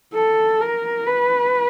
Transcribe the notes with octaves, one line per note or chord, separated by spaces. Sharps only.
A4
A#4
B4